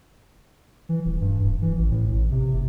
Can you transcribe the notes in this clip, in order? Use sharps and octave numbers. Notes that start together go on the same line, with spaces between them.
E3
D#1
G2
D1
E3
A1
A2
A1
C3
F#1